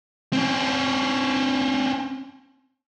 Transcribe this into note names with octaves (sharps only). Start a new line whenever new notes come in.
C4 C#4